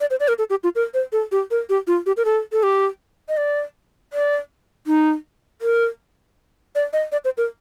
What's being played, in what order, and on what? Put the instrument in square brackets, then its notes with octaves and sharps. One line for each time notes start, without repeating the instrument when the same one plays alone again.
[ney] D5
C5
D5
A#4
A4
G4
F4
A#4
C5
A4
G4
A#4
G4
F4
G4
A#4
A4
A4
G4
D#5
D5
D5
D#4
A#4
D5
D#5
D5
C5
A#4